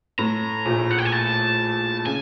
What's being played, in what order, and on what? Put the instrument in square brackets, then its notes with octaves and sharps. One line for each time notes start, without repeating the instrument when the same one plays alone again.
[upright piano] A2 [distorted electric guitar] A#5
[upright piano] A#1 A#2
[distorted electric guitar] F#5
G5
G#5
A5
[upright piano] C#3 [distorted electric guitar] G#5